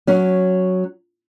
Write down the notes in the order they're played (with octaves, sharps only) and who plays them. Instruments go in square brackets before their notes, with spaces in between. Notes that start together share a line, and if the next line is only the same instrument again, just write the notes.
[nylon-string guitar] F#3 C#4